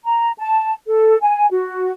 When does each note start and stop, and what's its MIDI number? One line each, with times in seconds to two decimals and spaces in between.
0.04 0.31 82
0.39 0.72 81
0.87 1.17 69
1.22 1.47 80
1.50 1.91 66